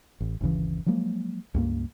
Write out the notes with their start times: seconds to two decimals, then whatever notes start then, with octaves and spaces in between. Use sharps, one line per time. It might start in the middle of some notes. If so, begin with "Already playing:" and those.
0.20 A1
0.41 G1 D#2 C#3 E3
0.86 F3 F#3 G#3 A#3
1.54 C#2 G2 A#3